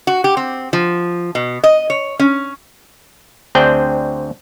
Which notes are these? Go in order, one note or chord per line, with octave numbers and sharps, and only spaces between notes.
F#4
G4
C4
F3
B2
D#5
C#5
C#4
D2 C4 D4 G#4 G5